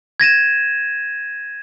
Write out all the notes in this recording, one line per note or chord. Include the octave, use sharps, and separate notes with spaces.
G#6 A#6 D#7 E7